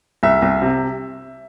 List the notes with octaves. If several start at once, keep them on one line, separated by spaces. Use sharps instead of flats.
C2 E5
C2
C3